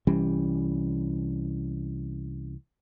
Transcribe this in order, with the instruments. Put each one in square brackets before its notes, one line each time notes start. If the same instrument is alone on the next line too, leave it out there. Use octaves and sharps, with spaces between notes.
[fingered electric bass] C2 E3 G3 C#4